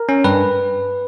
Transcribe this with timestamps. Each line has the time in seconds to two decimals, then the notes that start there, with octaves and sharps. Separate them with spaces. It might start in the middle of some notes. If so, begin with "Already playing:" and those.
Already playing: A#4
0.09 C#4
0.24 G2 B4